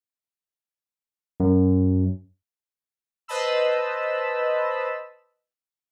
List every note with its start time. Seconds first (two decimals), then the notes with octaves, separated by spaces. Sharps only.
1.40 F#2
3.28 B4 C5 D#5 A5 B5 E6